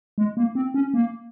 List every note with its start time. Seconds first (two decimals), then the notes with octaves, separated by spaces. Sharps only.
0.18 G#3
0.37 A#3
0.55 C4
0.74 C#4
0.94 A#3